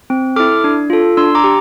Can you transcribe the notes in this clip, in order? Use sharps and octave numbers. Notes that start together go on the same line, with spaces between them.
C4
E4 A4 D6 F6
D4
F4 A4
D4 C6 E6
A#5 D6
G4